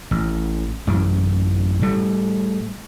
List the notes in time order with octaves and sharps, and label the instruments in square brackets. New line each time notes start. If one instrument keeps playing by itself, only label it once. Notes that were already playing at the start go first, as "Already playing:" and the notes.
[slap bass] A1
A1 F#2 E3
A2 G3 A3